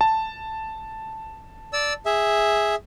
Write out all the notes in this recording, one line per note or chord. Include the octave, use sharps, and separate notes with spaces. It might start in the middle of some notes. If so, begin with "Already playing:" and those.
A5
D5 E6
G#4 E5